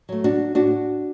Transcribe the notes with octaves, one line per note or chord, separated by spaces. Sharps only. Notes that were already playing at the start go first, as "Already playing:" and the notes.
F#3 A3
D4 F#4
A2 D4 F#4